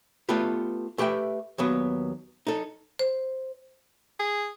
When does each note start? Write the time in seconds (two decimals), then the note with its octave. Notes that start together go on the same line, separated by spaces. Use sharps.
0.29 A3 B3 F4 G4 A4 B4
0.98 A3 G4 B4 E5 G5
1.58 D#2 F#3 B3
2.47 D#4 A4
2.99 C5
4.20 G#4